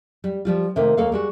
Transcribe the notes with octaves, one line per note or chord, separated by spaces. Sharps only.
G3
F3 G3 F4
C3 D#3 A3 A#3 D#4
D#2 A#3 A4 C#5 F5
G3 G#3 F#4